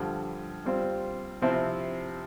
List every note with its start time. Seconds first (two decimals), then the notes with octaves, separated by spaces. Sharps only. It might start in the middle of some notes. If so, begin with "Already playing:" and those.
Already playing: G2 D3 F3
0.65 G3 C4 F4 C5
1.42 C3 F3 C4 E4